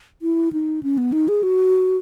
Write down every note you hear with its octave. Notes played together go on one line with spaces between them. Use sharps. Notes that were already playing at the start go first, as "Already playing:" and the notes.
E4
D#4
C#4
B3
D#4
G#4
F#4